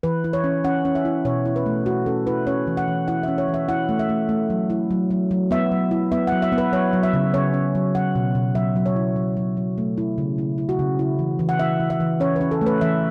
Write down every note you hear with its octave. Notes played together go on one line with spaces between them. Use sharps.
E3 B4
E4
C#5
C#4
C#4 F#5
C#4
E5
E4
B2 C#5
E4
B4
A3
A3 F#4
C#4 A4
E4 B4
C#4 C#5
E3
F#5
E3
E4 F#5
C#4 E5
C#5
E3
E5
E4 F#5
A3
E5
A3
A3
F#3
E4
F#3
F#3
F#3
B3 E5
F#3
E4
B3 E5
F#5
F#3
E5
B3
B4
F#3 C#5
F#3
E5
C#3
C#4 C#5
C#4
F#3
F#3 F#5
B2
B2
F#3 E5
F#3
C#5
E4
F#3
F#3
F#3
A3
E4
C#3
E4
E4
F#4
C#3
E4
E3
E3
F#5
E4 E5
E3
E5
E3
C#4 C#5
C#4 B4
A4
A3
B4
E3 E5